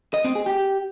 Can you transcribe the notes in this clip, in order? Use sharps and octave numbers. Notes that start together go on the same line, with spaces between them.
D#5
C4
G#4
G4